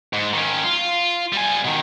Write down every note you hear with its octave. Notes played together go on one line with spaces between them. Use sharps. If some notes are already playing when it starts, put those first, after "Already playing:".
G#2
D#3 C#4
F4
G3 G#5
B2 D#3